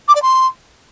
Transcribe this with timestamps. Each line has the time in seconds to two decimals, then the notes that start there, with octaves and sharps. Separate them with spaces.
0.08 D6
0.15 D5
0.22 C6